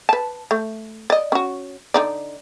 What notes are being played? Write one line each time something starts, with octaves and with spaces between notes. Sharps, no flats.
B4 A5
A3
D5 D#5
C#4 F#4
D3 D#4 D5